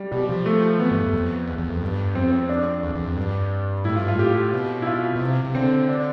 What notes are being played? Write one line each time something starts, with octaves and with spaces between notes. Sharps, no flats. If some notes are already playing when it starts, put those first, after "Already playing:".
Already playing: G3
B2 G3
F3
A3
E3 B3
G2
F2
F2
E2
E2
F2
G2
F2 C4
C4
D4
E2
E2
F2
G2
A2 E4
G2 F4
A2 F4
G4
B2
E4
F4
B2
C3
C3
D3 C4
D4